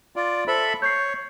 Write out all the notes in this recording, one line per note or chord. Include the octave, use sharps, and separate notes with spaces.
F4 D5
A4 C5 E5 B5
C#5 G6 C7